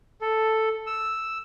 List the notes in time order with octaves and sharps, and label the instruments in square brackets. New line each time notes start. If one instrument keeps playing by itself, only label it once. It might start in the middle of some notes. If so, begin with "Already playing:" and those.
[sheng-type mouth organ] A4
E6